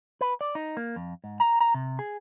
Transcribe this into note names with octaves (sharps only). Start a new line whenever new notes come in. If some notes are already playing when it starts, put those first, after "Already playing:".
B4
D5
D#4
A#3
F2
G#2
A#5
A#5
C3
G#4